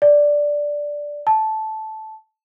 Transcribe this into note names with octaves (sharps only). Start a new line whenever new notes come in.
D5
A5